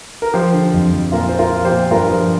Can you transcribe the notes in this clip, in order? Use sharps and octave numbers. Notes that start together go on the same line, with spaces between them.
A#4
F3 G4 C5
D3
F2
F2
A#2 F4 A#4
F3 C5
F4 A#4
F3
G4 C5
A#2
G2 F4 A#4
F3